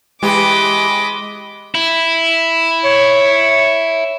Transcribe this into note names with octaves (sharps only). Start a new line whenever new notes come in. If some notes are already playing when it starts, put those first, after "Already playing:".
E3 G#3 G4 D#5 B5 D6
E4
C#5